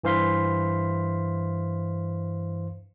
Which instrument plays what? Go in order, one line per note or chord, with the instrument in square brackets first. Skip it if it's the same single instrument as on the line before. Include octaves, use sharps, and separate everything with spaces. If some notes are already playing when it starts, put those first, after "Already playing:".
[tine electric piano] G2 E3 C5 F5 C6 B6